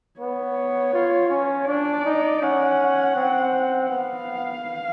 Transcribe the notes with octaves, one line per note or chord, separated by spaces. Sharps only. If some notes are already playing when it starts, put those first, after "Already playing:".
B3 C#5
F4
C#4
D4 D5
D#4
C#4 F#5
C4
B3 F5